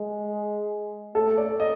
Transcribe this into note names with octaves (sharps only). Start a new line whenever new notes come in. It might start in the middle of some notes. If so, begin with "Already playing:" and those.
Already playing: G#3
A3 A4
D5
D#5